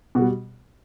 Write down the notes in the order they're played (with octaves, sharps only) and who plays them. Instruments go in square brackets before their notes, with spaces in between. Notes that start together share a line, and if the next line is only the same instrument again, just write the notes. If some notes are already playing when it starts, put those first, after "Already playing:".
[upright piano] B2 G3 F#4